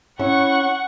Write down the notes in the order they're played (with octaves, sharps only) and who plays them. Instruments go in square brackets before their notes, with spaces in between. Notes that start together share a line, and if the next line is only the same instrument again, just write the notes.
[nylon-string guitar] C#4 E4 [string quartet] F#5 C#6